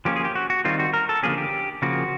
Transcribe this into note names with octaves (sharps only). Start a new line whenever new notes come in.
F3 A#3 C#4 G4
G#4
G4
F#4
F#4
D#3 G3 C4 F4
F#4
A#4
A4
D3 F3 A#3 C#4 G#4
G4
C#3 F3 A#3 F#4